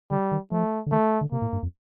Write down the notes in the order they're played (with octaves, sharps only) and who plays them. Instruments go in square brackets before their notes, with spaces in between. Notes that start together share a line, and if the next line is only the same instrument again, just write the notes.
[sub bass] D3 [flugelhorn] G3
[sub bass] D#3
[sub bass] F3 [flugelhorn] A3
[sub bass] D3
[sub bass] D#3 [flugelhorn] A3
[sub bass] D3
[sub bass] C3 [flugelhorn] A#3
[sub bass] A2
G2
F2